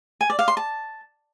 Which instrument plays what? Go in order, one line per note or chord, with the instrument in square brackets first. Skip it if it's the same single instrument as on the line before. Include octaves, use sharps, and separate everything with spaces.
[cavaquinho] G#5
D5
F5
C6
A5